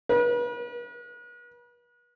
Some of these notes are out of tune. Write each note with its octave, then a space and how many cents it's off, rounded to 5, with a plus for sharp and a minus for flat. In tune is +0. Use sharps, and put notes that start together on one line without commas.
B4 -40